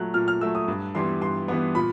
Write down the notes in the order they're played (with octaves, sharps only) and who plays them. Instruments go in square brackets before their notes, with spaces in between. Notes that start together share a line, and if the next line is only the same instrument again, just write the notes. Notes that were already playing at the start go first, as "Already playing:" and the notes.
Already playing: [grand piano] A#2 F#3 A3 F#6
A#2 F6
F6
F#3 A3 E6
D#6
G2
E3 G3 B3 C6
G2 C6
E3 G3 B3
A#2 B5